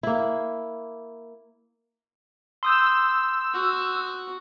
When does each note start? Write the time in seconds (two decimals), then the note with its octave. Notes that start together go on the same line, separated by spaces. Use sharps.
0.03 A#3 E4
2.63 C6 D#6 E6 G6
3.54 F#4